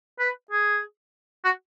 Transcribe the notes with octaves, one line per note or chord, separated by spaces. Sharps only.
B4
G#4
F#4